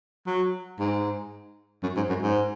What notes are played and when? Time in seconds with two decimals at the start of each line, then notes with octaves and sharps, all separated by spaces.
0.26 F#3
0.79 G#2
1.83 F#2
1.96 G#2
2.09 F#2
2.22 G#2